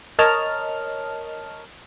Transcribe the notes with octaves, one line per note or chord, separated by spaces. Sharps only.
A#4 C#5 D#5 A5 F6